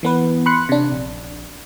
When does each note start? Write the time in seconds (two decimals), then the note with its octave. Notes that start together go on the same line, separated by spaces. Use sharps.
0.03 E3 B3 B4
0.46 B5 C6 F#6 C#7
0.69 C3 D4
0.92 A#1